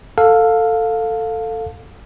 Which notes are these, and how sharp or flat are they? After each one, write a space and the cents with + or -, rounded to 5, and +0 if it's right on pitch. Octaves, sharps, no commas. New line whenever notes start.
A4 +15 F5 +15